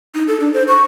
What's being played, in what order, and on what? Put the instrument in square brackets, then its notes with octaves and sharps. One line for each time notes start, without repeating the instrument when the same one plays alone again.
[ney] D#4
A4
D4
C5
C#6